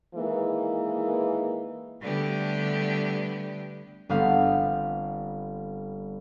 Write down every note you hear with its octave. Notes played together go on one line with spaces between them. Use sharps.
D#3 E3 G#3 A#3
D3 G3 A3 B3 G4
G1 G3 B3 C4 F5